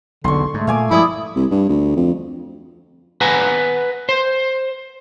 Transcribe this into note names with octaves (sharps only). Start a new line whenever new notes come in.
B1 E2 D3 C6 C#6
G#2 A3
A#2 G#3 A#3 F5 G#5 D6
G2 F3 G#3 E4 D5 D#6
C2
G2
D2
F2
B4 F#5 G#5 A#5
C5